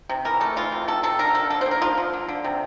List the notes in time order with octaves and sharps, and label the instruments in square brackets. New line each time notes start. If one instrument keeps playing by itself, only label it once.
[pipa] C3
E3 A#4
A3 A4
E3 F4
C3
C3 A4
C3 A4
D3 A#4
F3 A4
D3 A4
A#3 C5
A#4
D3 F4
F3
D3
D3
C3